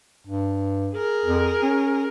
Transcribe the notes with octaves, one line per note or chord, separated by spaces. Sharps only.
G2
G#4 A#4
F2
C#4